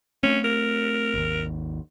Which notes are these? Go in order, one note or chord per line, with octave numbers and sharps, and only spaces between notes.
A3 C4 C#4
A#4
G#1 D#2